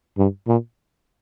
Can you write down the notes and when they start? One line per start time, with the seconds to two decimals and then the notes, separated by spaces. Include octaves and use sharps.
0.18 G2
0.47 A#2